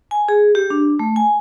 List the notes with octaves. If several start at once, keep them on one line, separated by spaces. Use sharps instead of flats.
G#5
G#4
G4
D4
A3
G#5